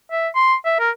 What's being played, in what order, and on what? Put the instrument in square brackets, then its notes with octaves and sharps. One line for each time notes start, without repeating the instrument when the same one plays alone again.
[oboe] E5
C6
E5
A#4